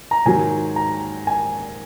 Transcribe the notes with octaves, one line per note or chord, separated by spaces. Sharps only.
A#5
G#2 D#3 F#3 G#5
A#5
G#5